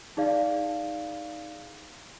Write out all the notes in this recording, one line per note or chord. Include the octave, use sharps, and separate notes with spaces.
D#4 G#4 D5 F5